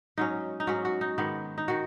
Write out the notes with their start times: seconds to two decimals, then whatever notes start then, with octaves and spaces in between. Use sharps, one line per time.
0.18 G#2 F#3 C#4 D#4
0.60 D#4
0.67 G#2 F#3 C#4 F#4
0.85 F#4
1.01 D#4
1.18 G#2 D#3 B3
1.58 D#4
1.68 D#3 F#4